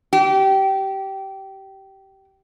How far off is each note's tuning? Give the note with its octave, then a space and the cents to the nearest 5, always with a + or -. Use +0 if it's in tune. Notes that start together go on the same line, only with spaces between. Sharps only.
G4 -20